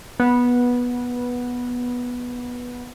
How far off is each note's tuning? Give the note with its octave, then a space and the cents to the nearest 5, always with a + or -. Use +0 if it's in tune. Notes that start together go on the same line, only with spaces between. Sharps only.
B3 -10